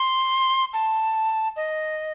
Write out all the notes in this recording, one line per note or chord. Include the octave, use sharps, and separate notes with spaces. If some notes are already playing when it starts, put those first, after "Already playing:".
Already playing: C6
A5
D#5